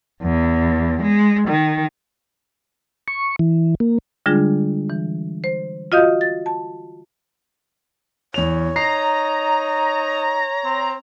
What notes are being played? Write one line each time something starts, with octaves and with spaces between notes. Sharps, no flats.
E2
G#3
D#3
C#6
E3
A#3
D3 G3 G#3 D4 F4 G#4
E3
C5
F4 F#4 D#5 F5 D#6 G6
A6
A5
E2 C#5 F7
D#4 A#5 C7
C4